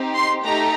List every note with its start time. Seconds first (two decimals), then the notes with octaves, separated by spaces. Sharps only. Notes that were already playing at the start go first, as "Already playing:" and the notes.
Already playing: C4 D#4 G4
0.15 C6
0.44 A3 D#4 G4 A#5